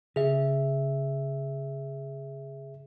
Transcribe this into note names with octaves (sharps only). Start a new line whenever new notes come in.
C#3 G#4 E5